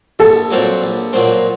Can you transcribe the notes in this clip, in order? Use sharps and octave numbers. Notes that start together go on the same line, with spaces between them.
A#1 A4
A#2 F#3 C4
A#1
A#2 F#3 C4